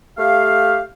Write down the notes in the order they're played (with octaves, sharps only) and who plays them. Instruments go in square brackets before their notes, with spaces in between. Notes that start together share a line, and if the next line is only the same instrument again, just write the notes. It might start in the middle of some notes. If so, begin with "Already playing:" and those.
[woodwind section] A3 G4 F5